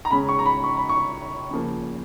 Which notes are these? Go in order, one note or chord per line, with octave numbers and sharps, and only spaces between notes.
A#5
C#3 G#3 C#4 B5
C#6
A#5
B5
C#6
B5
C#6
C#3 F3 A#3